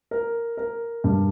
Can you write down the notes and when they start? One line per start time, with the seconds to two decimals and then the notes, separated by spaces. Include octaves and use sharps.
0.11 A#4
0.57 A#4
1.04 G2